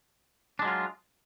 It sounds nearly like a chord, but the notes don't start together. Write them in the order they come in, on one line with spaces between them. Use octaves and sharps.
D4 G#3 F#3 F4